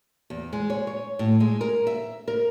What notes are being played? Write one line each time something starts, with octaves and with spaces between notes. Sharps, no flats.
E2
G#3
C#5
C#5
A2
G#3
A#4
E5
A#4